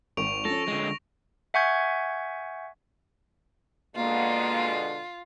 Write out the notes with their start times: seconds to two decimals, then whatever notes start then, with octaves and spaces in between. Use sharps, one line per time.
0.17 G#1 C#6 D7 F7
0.45 F3 C#4 A4 A#6
0.68 D3 G#3
1.54 E5 F#5 G#5 C#6 G6 G#6
3.96 B2 D3 G#3 A#3 F4